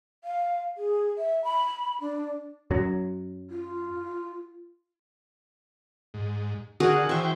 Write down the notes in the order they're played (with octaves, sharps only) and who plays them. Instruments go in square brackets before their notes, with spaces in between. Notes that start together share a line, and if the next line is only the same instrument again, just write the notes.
[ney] F5
G#4
E5
B5
D4
[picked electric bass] F#2 F#3
[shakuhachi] F4
[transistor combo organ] G#2
[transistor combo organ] D3 F#5 [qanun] F#4 G#4 A#4
[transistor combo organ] E3 C5 G5 [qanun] E5 C#6